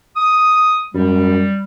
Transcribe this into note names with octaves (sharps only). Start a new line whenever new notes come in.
D#6
F#2 G3